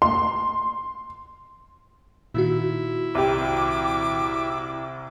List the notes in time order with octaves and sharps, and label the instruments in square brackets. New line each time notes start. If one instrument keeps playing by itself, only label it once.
[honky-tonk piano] C6
[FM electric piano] A#2 D#3 F#4 [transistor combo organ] E4
[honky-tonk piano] C2 G4 [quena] D6